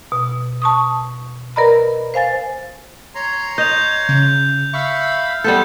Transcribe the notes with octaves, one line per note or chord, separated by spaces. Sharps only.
B2
A5 C#6 D#6
A#4 B4 D5 D#5 A#5 B5
C5 F5 G#5 A6
C#5 A#5 C6
D#5 G6 F7
C#3
E5 F5 B5 C#6
G3 B3 A4 C6 G6